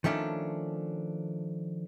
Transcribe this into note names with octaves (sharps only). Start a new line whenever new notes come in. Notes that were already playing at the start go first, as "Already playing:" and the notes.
D#3 F3 A3 C#4 D4